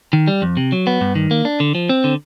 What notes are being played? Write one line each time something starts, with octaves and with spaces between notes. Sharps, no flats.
D#3
G3
F2
C3
F#3
B3
G2
D#3
A#3
D4
D3
F3
C4
D3